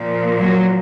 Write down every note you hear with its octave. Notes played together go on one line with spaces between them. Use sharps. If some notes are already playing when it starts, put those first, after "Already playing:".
Already playing: A#2 F3
F#3